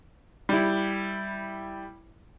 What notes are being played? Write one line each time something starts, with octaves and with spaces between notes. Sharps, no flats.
G3 E4